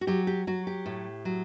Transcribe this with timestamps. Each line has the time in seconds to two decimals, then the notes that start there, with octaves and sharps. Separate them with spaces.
0.01 F#4
0.07 F#3 G4
0.27 G4
0.47 F#3 F#4
0.67 G4
0.86 A2
1.25 F#3